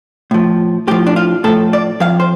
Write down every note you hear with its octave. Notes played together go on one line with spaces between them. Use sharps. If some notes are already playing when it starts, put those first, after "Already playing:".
A2 F3
A2 F3 G4
D4
F4
A2 F3 A4
D5
F2 F3 F5
C5